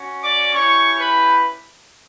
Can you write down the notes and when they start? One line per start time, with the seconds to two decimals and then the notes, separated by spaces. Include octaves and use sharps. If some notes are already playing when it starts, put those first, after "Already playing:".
Already playing: C#4 F#4
0.22 D5 D6
0.53 C#4 E4 G4 C#5 C#6
0.99 B4 B5